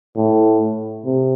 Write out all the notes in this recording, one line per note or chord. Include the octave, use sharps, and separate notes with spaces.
A2
C3